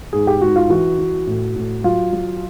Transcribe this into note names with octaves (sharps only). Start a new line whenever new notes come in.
G#2 G#4
G4
G#2 F#4
F4
E3 F#4
E3
A2
A2
F#3 F4
F#3